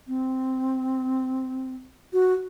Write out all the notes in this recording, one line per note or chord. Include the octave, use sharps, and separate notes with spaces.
C4
F#4